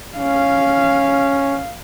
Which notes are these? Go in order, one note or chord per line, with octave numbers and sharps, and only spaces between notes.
C#4 F5